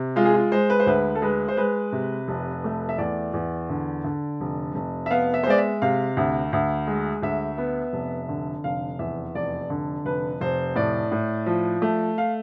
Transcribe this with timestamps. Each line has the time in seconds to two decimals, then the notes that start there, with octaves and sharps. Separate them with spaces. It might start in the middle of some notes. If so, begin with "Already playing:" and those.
Already playing: C3
0.16 G#3 F4
0.25 G#4
0.34 F4
0.52 G#3 C5
0.70 B4
0.80 C5
0.86 D2 B4
1.15 A4
1.22 G#3 B4
1.48 C5
1.57 G#3 B4
1.92 C3
2.28 F1
2.64 A3
2.89 E5
2.98 E2 D5
3.34 E2
3.69 D3
4.04 D3
4.41 F1
4.75 F1
5.06 E5
5.11 B3 F5
5.34 E5
5.44 C5
5.47 G#3 D5
5.58 E5
5.82 C3 F5
6.17 D2
6.53 D2
6.87 G#3
7.22 D2 E5
7.58 B3
7.93 F1
8.29 D3
8.64 F1 F5
8.99 E2 E5
9.35 F1 D5
9.70 D3
10.05 F1 B4
10.41 F1 C5
10.75 A2 D5
11.11 A2
11.46 F3
11.82 A3
12.18 F5